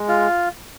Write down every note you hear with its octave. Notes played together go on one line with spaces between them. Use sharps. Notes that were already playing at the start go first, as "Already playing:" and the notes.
Already playing: G#3
F4